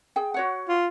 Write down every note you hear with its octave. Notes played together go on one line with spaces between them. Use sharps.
G#4 G5
F#4 C#5 F#5
F4